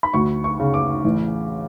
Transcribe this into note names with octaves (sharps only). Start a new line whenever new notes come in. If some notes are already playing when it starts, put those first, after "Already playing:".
B5
D2 C#6
C#6
C#3
D6
A1